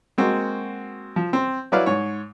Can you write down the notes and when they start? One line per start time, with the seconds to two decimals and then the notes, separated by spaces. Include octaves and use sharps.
0.18 G#3 A#3 C4 F#4
1.16 F3
1.33 C4 C5
1.72 F#3 E4 B4 D5 F5
1.86 G#2 C#5